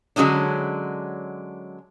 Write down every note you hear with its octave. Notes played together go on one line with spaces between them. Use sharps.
D3 F#3 G#3 C#4 D4